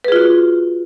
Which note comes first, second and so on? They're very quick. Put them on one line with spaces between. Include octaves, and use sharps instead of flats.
B4 G#4 F4 F#4